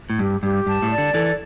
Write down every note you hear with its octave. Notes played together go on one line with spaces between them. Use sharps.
A2
G2 G4
G2 G4
G2 A5
A2
D5
D3
E3 A4